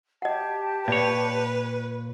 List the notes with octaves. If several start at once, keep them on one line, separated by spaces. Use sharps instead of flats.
G4 D#5 F#5 A5
A#2 B4 C#5 D5